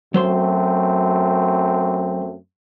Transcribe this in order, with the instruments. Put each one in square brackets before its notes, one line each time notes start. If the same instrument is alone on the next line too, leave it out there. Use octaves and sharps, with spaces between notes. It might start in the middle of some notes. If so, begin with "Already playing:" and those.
[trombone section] F#2 A3 C4 [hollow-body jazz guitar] F#3 C5 C6